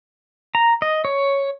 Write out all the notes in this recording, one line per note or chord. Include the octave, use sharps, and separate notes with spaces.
A#5
D#5
C#5